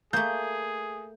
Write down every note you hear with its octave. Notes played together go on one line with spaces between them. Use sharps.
A3 A#3 G#4 G6